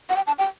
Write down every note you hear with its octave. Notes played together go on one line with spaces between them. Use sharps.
F#5
G5
A5
G5